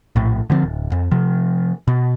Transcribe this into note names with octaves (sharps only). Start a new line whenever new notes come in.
A#1 A2
D3 F3 B3 C4
D1
F2
C3 F3
B2